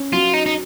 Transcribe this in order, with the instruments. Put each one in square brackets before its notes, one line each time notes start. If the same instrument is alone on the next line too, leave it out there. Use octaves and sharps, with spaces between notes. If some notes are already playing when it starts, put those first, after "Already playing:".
Already playing: [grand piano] C#4
[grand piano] F#3 [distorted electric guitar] F4
[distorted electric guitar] D#4
D#4